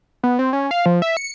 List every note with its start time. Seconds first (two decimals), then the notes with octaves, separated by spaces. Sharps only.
0.23 B3
0.39 C4
0.53 C#4
0.71 F5
0.86 F3
1.02 E5
1.17 C#7